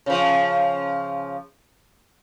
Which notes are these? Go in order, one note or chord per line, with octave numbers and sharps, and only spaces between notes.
C#3 F3